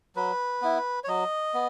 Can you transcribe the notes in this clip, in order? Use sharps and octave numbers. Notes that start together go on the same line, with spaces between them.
F#3 B4
B3 E4
C#5
F#3 D#5
B3